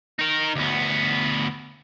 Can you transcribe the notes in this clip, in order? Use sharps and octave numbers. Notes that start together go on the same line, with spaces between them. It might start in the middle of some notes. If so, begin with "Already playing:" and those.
D#4 A#4
D2 B3